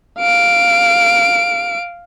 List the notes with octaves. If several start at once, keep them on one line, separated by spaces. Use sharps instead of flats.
F5 D7